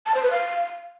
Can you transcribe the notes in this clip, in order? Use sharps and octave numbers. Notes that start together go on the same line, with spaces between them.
A5
C5
B4
F5